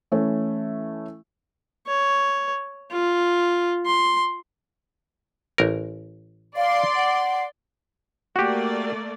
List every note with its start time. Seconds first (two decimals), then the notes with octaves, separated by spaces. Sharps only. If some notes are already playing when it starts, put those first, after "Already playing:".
0.12 E3 A3 C#4 E4
1.87 C#5
2.91 F4
3.86 C6
5.58 A1 A#4
6.57 D5 F5 C6
6.95 F#5
8.36 A3 A#3 F#4 G4 D5